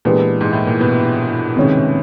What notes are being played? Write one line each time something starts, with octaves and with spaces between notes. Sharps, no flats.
A#2 E3 G#3 B3 D4 G4
G#2
A2
A#2
B2
C3 D#3 G#3 C#4